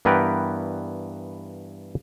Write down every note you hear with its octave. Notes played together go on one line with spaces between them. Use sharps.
G2 E3 B3 A#4 B4 G5